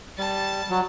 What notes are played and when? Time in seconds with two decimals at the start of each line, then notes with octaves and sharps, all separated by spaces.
0.18 G3 A5
0.70 F#3